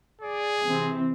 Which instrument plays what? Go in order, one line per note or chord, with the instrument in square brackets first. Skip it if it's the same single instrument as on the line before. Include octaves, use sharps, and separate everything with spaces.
[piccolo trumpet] G#4 [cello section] D5
[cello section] C3 E3 C4